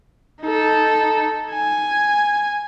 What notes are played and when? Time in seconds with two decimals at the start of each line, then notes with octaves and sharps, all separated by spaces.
0.41 D#4 A4
1.52 G#5